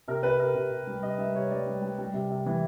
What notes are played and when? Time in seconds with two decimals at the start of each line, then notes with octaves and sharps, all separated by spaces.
0.08 C3 A#4
0.23 C3 B4
0.39 C3 A#4
0.55 C3
0.71 C3
0.87 G3
1.03 C3 D#5
1.18 G3 E5
1.35 C3 C#5
1.51 G3 D5
1.67 G3
1.82 G3
1.98 G3
2.14 C3
2.30 C3
2.46 E3